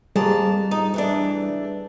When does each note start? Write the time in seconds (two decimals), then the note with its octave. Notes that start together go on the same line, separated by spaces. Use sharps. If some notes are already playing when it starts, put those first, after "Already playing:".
0.16 F2 G3 A#3 G#4 A5
0.71 D#4
0.94 E3 A3 D4